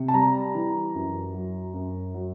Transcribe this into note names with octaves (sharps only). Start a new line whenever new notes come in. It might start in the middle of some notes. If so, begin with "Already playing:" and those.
Already playing: C3
A5
G3 A#5
E3
F#2
F#3
F#2
F#3